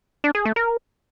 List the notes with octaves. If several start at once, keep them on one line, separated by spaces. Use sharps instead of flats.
D4
G#4
A3
A#4